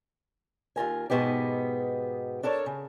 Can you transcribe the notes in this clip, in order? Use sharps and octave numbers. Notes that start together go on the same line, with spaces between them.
D#2 F4 A#4 G#5
G#2 B2 B3 D#4 G4
D4 A4 A#4 C#5
C#3